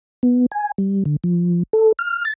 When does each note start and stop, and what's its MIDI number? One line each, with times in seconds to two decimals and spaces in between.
0.23 0.46 59
0.52 0.72 80
0.78 1.04 55
1.05 1.16 50
1.24 1.63 53
1.73 1.92 69
1.99 2.25 89
2.25 2.33 93